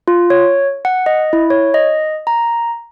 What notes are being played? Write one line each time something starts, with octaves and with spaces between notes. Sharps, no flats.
F4
C#5
F#5
D#5
E4
C#5
D#5
A#5